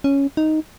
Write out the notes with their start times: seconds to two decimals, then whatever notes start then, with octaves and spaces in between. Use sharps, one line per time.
0.04 C#4
0.37 D#4